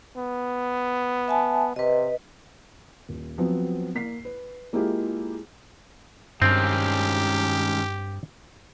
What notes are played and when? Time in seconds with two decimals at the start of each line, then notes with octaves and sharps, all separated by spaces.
0.16 B3
1.28 E5 G#5 A5
1.76 C3 B4 D#5
3.09 D#1
3.38 F3 F#3 B3 C4
3.95 A#3 B6 C7
4.25 B4
4.73 G#3 A#3 E4 F4 G4 G#4
6.42 G2 D#3 G#3 C4 C#4 G4